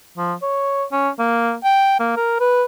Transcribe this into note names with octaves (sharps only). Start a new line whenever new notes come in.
F3
C#5
C#4
A#3
G5
A#3
A#4
B4